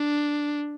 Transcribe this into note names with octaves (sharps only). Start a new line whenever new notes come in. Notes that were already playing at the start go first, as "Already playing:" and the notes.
Already playing: D4